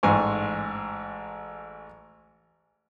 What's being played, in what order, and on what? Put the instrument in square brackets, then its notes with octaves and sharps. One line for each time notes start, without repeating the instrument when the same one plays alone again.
[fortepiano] A1 G#2 G#5 C6 C#6